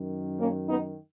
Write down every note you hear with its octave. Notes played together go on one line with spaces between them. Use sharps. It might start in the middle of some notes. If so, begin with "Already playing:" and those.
Already playing: F#2 D#3
A#3 C#4
B3 D#4